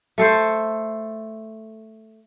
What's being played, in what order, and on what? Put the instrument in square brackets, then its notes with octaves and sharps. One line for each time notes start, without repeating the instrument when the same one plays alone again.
[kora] A3 A4 C5